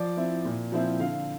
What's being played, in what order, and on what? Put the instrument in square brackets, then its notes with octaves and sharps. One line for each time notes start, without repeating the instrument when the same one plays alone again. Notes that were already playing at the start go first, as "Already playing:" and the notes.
Already playing: [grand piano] F3 D5
C4 E4
A#2
F3 C4 E4
D3 F5